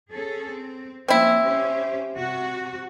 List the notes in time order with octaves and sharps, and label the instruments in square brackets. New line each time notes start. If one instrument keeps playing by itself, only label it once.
[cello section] C#4 G#4 A4
C4
[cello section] F3 A#3 C#4 [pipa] C4 E4
[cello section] C#4 G4 C5
C3 F#4